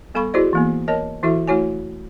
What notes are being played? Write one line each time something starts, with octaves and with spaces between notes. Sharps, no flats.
G3 B3 A4 F5 B5 C#6
E4 F#4 G#4 C5 D5 D#5
E3 A#3 B3
A#4 C#5 D#5 A5
E3 E4 F#4 A4 E5
A3 E4 F#4 C#5 G#5